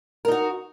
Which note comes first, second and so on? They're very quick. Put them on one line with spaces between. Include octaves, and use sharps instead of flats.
A#4 D#4 F#4